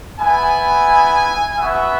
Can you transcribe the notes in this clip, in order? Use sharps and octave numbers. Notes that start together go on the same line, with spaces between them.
B3 E4 G#5
B3 F#4 E5